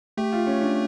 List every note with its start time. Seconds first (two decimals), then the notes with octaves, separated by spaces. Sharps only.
0.17 A3 G4
0.33 F4
0.47 C#4
0.61 D4